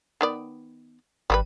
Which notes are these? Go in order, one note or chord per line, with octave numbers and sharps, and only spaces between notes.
D#3 B3 D5
G#1 G3 C4 B4